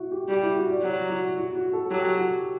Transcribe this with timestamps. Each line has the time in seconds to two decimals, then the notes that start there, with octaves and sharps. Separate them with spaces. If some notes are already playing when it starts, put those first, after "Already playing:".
Already playing: E4 F#4
0.11 G4
0.29 G3 G4
0.43 E4
0.56 F#4
0.70 D5
0.83 F#3 F#4
1.10 F#4
1.37 F#4
1.55 F#4
1.73 A4
1.90 F#3 G4
2.18 F#4